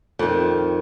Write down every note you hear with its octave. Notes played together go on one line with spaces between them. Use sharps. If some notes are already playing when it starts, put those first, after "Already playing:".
F2 D#3